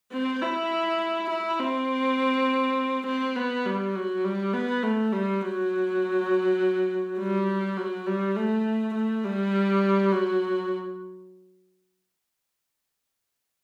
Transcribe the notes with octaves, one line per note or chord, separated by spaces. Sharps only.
C4
E4
E4
C4
C4
B3
G3
F#3
G3
B3
A3
G3
F#3
G3
F#3
G3
A3
A3
G3
F#3